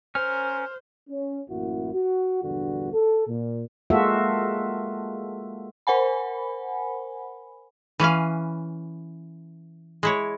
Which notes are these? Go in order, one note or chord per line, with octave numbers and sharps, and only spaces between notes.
C#4 A#4 C5 F6
C#4
A1 F#2 A#3 E4 F#4
F#4
A#1 E2 G2 D3 F#4
A4
A#2
G#3 A#3 F4 F#4 A4 E5
A#4 C5 F#5 G#5 B5
E3 C#4 B4 F5
G#3 E4 C#5